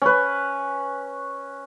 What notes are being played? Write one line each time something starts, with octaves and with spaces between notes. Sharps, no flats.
C#4 B4